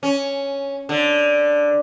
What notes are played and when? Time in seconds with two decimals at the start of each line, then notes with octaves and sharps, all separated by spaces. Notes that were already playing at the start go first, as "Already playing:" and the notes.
0.03 C#4
0.89 D3